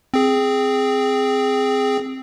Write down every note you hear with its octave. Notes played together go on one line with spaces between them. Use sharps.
C4 G#4